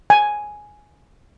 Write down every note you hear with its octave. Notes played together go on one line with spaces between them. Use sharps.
G#5